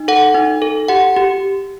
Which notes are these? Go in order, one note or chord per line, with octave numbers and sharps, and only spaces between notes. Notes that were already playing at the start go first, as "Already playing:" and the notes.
Already playing: D#4
A4 F#5
D#4
A4
G4 F#5
G4